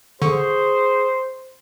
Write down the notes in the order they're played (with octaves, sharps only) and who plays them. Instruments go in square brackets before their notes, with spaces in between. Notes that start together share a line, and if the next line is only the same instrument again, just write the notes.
[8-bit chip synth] D3 [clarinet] G#4 [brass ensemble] C5 [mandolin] C#6